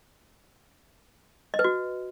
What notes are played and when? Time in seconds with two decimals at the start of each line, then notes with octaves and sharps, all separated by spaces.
1.54 D#5
1.59 B4
1.64 F#4